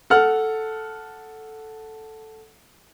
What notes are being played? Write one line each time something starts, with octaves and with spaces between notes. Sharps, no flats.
A4 F#5 F6